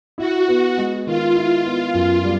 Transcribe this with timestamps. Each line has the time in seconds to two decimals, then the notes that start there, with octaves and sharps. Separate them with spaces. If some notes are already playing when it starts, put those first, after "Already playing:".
0.18 E4 F#4
0.48 B3
0.78 G#3
1.06 D#3 F4
1.36 E4
1.65 B3
1.94 F#2
2.24 G3